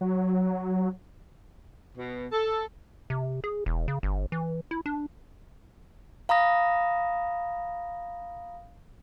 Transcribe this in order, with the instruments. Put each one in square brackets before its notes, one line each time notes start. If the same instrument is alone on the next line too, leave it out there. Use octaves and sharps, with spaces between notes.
[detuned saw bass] F#3
[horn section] B2
A4
[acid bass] C3
G#4
E1
C#3
G1
E3
E4
D4
[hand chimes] F5 A#5 B5 D#6 A#6